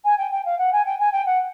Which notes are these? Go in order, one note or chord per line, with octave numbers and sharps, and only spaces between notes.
G#5
G5
G5
F5
F#5
G#5
G5
G#5
G5
F#5